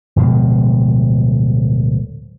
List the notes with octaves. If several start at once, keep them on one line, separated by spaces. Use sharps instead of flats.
D1 B2 F3 G#3